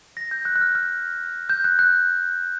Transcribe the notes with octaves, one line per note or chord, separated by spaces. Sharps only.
A#6
G6
F#6
F#6
F6
F6
G6
F#6
F#6